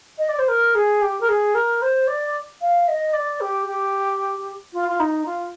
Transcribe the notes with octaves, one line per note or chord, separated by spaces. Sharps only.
D#5
D5
C5
A#4
G#4
G4
A#4
G#4
A#4
C5
D5
F5
D#5
D5
G4
G4
F4
F4
D#4
F4